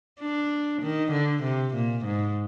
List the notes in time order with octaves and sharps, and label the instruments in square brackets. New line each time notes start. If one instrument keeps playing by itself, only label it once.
[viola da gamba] D4
D#3
D3
C3
A#2
G#2